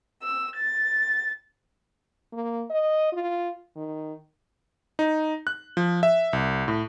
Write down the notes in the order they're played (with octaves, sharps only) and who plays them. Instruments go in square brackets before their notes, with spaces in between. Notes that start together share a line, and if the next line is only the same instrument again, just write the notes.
[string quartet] E6
A6
[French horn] A#3
D#5
F4
D#3
[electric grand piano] D#4
F#6
F3
E5
C2
A2